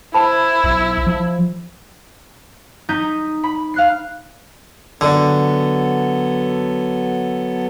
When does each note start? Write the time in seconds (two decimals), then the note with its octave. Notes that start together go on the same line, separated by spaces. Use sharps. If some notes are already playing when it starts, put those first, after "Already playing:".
0.14 E4 C5 A5 B5
0.64 B1
1.07 F3
2.89 D#4 D#6 G6 B6
3.43 B5
3.74 F5 F#6 C7
5.01 D3 F#3 B3 A4